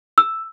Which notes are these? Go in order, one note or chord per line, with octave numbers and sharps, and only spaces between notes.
E6